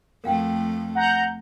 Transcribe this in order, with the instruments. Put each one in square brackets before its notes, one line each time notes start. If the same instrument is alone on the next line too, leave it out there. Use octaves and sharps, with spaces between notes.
[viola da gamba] F2 A3 [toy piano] A#4 F5 G5
[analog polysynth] F#5 A#5 G6